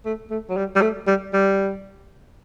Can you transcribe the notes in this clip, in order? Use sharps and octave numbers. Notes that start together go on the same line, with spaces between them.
A3
A3
F#3
G3
G3
A3
G3
G3